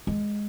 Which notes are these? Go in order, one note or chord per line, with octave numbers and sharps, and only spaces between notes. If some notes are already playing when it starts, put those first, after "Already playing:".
G#3